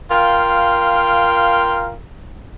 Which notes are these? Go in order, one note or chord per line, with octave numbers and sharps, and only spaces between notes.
F4 A#4 F5 G5